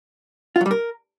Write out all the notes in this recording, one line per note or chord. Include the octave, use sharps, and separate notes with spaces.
F4
F#3
G3
A#4